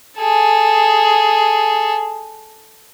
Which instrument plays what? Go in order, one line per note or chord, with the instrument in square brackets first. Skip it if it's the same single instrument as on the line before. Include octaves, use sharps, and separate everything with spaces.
[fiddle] G#4 A4